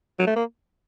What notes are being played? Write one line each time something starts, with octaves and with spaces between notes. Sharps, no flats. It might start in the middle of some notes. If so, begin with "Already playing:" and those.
F#3
A3
A#3